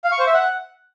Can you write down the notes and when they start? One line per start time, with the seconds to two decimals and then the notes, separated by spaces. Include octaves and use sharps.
0.04 F5
0.12 C#6
0.19 C5
0.27 E5
0.34 F#5